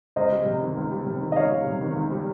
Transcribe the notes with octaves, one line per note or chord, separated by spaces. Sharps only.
C#2 C5 D#5
G3
C3
D#3
C#2
G3
C3
D#3
D#5
C#2 C#5 F5
G3
C3
D#3
C#2
G3